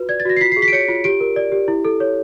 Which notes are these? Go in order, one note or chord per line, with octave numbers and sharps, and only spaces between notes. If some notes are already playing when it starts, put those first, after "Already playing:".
Already playing: F4 F#4 B4
D5 G#6
A6
F#4 A#6
C7
F4 B6
C7
G#4
B6
D7
C#5 C#7
F4
G4 D7
A#4
D5
G4
E4
A4
C#5